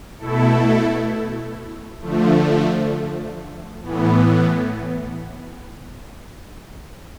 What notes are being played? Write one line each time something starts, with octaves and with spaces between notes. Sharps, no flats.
B2 A3 E4 A4
D3 F3 A3
A2 E3 B3